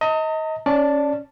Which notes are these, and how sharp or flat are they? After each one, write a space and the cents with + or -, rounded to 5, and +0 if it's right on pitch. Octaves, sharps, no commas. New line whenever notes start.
D#5 +25 A#5 -45
C#4 +0 D5 +0 A5 +0